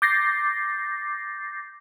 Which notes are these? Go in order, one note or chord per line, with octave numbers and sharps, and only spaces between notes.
D6 G6 A6 A#6 C7